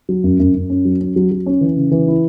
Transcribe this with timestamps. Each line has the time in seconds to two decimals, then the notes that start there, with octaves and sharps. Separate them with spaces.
0.09 F#3
0.24 F#2
0.40 F#2
0.54 F#2
0.70 C#4
0.85 F#3
1.01 C#4
1.16 F#3
1.32 F#3
1.46 C#4
1.61 E3
1.76 C#3
1.91 E3
2.08 E4